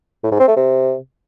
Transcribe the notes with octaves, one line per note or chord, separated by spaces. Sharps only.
A2
G#2
C4
A3
C3